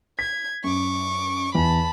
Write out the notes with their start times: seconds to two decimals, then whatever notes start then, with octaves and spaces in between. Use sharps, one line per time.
0.19 G#6 B6
0.64 F#2 C#6 D6
1.55 E2 A5 B5